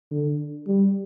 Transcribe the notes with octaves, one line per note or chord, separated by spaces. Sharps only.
D3
G3